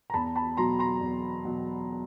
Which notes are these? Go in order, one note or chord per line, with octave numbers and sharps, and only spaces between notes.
A#5
E2 A5 B5
A5 B5
B2 F#3 A#5 C6
A#5 C6
E2
B2 F#3